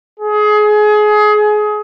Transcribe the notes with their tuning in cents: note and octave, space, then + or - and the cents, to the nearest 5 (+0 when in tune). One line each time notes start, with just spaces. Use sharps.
G#4 +25